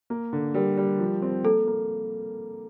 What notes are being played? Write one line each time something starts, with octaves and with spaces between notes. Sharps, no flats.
A#3
D3
G3 A#4
G3
F3
C4
A#3 A4
A#3